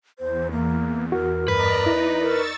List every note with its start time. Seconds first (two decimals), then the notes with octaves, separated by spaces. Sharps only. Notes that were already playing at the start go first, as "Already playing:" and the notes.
0.19 E2 C5
0.52 A#3
1.12 F#4 A#4
1.48 G2 B4 D5 D#5 A#5
1.86 D#4 E4
2.22 A#4 C#6 E6 A6